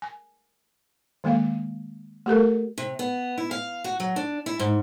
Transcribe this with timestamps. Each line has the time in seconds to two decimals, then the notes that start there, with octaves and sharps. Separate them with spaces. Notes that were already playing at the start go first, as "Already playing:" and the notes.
0.02 G#5
1.24 D#3 G#3 A#3 F5
2.26 A3 G4 A4 A#4
2.78 C3
2.99 B3
3.38 E4
3.51 F5
3.84 F#4
4.00 F#3
4.16 D4
4.46 E4
4.59 G#2